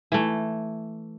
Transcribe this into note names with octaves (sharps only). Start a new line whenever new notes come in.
E3 A3